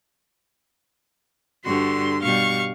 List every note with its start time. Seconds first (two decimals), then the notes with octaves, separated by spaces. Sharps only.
1.65 G2 D3 F#4 C6
2.22 B2 G3 F5 C#6